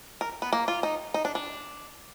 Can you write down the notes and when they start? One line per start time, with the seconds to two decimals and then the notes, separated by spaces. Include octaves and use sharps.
0.21 A#4
0.42 B3
0.53 A#3
0.68 F4
0.83 D#4
1.14 D#4
1.25 D4
1.35 D4